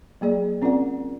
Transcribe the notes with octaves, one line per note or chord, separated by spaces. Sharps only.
F#3 A#3 G#4 D5
C4 C#4 F4 A#4 D5 F#5